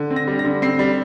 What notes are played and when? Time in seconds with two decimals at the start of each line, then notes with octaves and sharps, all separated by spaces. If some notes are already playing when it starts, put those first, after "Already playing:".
Already playing: D3
0.10 C4
0.16 A#6
0.27 G3
0.39 A#6
0.45 D3
0.62 C4 C7
0.79 G3